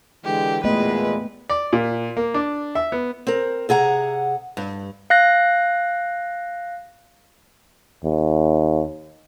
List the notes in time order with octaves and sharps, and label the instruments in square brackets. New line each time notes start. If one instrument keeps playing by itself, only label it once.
[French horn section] D3 E3 G#3 [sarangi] G4
[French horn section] E2 A#2 G#3 [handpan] A3 B3 D#5 [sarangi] B4
[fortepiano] D5
A#2
A#3
D4
E5
B3
[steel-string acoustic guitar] C4 A#4
C3 G#4 F#5 A#5
G2
[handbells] F5 F#6 A#6
[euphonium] D#2